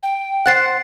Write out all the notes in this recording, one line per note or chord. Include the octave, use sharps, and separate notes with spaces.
G5
C5 F#5 F#6 A6 C7